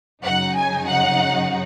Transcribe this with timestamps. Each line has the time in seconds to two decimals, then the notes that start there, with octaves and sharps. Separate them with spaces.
0.24 F#2 C#3 F#3 D#4 F#5
0.56 G#5
0.89 F#5